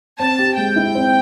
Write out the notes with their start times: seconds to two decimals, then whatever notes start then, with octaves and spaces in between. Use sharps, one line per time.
0.19 C4 A5
0.38 G4
0.57 G#3 G5
0.76 E4
0.95 C4